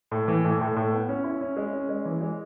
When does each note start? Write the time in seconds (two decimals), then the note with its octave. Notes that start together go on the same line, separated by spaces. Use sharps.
0.11 A2
0.28 E3
0.44 A2
0.61 A2
0.76 A2
0.93 B3
1.09 C#4
1.24 E4
1.41 C#4
1.57 G#3
1.73 C#4
1.89 G#3
2.05 E3
2.21 G#3